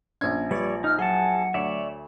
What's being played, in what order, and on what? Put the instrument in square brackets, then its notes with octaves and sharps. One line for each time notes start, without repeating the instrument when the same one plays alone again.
[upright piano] A#1 G#6 [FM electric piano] C#4 D4
[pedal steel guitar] G3 C#5 D5 [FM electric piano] F4 B4
[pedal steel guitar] D#4 [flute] F6
[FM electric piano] F#3 [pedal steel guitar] G#4 A5 [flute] F#5
[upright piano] D2 [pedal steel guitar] C#5 D5 E5